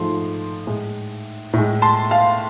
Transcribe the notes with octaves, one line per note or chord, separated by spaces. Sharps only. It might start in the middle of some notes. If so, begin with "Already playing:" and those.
Already playing: G#2 F3 A3 C6
A2 G#3
A2 G#3
A5 C6
F5 A5